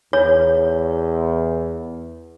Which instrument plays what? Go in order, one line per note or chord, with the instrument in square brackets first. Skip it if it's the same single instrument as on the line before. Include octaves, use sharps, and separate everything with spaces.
[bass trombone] E2 [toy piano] C#5